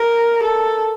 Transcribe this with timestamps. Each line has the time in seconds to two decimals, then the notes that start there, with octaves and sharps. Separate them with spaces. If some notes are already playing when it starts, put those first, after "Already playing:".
Already playing: A#4
0.43 A4